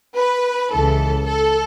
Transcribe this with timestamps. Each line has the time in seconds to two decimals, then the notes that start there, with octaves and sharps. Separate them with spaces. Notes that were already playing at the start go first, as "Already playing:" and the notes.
0.16 B4
0.71 C#2 C#3 E3 A4
1.25 A4